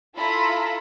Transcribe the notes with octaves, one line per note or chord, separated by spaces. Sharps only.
E4 F4 A4 A#5 B5